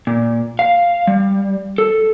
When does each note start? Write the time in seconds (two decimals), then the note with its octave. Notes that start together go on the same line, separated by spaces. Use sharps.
0.07 A#2
0.59 F5
1.07 G3
1.78 A4